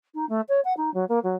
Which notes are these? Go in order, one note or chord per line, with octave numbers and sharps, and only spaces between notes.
D#4
A3
C#5
F#5
D#4
F#3
A#3
F#3